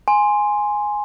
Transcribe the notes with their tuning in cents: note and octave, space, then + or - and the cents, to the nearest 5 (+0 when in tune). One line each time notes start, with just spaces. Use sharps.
G#5 +0 C6 +0